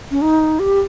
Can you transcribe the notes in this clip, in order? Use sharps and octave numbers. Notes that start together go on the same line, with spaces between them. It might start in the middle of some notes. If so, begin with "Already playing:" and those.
C#4
D#4
G4